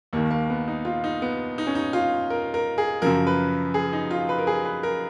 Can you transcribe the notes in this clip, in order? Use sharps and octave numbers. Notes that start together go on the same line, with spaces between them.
D#2 D#3 A#3
A#3
B3
D#4
F4
D#4
B3
D#4
C#4
D#4
F4
A#4
A#4
G#4
F#2 C#3 F3 A#4
B4
G#4
D#4
F4
B4
A#4
G#4
B4
A#4